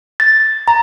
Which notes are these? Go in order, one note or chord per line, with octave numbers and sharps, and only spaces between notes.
A6
A#5